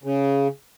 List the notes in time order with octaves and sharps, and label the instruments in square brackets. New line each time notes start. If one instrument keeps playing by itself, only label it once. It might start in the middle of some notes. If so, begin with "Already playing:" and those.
[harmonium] C#3